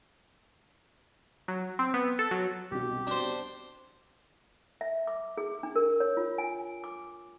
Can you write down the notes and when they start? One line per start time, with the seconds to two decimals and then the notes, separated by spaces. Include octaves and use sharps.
1.48 F#3
1.79 C4
1.94 B3
2.19 A4
2.31 F#3
2.71 C2 B2 G4
3.07 D4 C5
4.81 E5
5.07 D6
5.38 G#4
5.63 D4
5.76 A#4
6.00 C#5
6.17 F4
6.38 G#5
6.84 D6